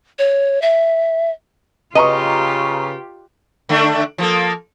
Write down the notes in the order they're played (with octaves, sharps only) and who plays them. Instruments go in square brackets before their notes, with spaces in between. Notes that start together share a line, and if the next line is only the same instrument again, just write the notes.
[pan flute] C#5
E5
[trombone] C#3 [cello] F4 G4 [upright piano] B4 A#5 C#6 [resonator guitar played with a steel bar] D#5
[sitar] D3 A3 D4
F3 A#3 A4